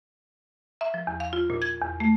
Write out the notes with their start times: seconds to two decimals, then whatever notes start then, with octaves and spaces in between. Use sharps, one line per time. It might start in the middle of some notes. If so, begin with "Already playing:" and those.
0.81 E5
0.94 F3
1.07 E2
1.20 F5
1.33 F4
1.50 A#2
1.62 G#6
1.82 E2
2.00 A3